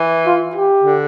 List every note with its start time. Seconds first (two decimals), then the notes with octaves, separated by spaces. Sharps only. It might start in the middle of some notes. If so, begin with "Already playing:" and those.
Already playing: E3
0.26 F4
0.55 G4
0.84 D3